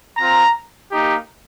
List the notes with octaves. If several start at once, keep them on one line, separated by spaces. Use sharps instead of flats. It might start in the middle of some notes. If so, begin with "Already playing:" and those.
C4 F4 A#5
A#3 D#4 G4